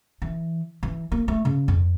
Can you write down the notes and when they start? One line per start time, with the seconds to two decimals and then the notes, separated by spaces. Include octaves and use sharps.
0.22 E3
0.83 E3
1.12 A#3
1.28 A3
1.45 C#3
1.68 F2